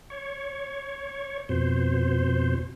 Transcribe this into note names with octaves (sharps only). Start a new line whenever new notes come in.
C#5
F2 B2 C5